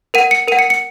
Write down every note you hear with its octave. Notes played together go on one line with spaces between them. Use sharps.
A#4 F#5 D#7
C#7
A#4 F#5 D#7
C#7
C#7